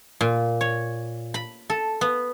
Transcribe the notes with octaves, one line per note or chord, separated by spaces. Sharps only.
A#2
C#5
B5
A4
B3